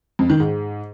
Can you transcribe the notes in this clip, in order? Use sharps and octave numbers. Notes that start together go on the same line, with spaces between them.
F2
D#3
G#2